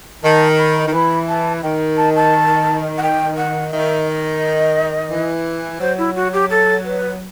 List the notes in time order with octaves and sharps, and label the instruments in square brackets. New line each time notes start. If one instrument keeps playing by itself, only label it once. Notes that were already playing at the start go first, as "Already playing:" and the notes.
[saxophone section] D#3 [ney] A5
[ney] B5
[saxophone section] D#3
[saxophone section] E3 [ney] B5
[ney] A5
[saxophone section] D#3 [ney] G5
[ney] A5
A5
F#5
G5
F#5
[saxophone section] D#3 [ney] E5
[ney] D#5
[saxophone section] E3
[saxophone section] F#3 [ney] C5
[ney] E4
F#4
G4
A4
B4